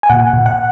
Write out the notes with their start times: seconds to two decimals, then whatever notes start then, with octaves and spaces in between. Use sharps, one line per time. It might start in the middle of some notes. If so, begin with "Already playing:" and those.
0.03 G#5
0.09 A#2 F#5
0.33 A#2
0.46 F#5